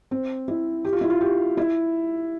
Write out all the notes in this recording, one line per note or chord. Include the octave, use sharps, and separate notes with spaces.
C4
E4
G4
F4
E4
F4
G4
E4